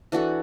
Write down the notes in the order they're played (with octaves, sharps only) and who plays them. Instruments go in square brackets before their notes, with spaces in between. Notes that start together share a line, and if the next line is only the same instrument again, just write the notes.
[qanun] E3 D4 F#4 A4